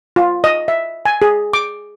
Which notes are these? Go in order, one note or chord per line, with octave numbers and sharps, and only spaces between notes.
F4
D#5
E5
G#5
G#4
D6